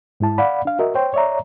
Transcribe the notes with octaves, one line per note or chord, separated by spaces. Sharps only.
G#2 G#3 E4 A5
D5 F5 F#5 B5
D4 F5
F#4 A#4 D#5 E5
C5 C#5 G5 C6
C#5 D5 E5 A#5